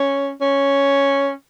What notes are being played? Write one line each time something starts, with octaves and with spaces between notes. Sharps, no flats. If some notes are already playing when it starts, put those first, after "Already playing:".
Already playing: C#4
C#4